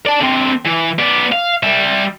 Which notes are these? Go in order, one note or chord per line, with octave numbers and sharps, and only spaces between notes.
D5 A5
D3 C4
E3
B3 D5
F5
G3 E5